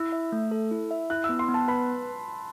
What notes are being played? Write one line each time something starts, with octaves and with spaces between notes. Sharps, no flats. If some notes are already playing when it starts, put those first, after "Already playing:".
Already playing: E4 E6
E5
A3
A4
E4
E5
E4 F#6
E6
B3
C6
B3
A5
B4 B5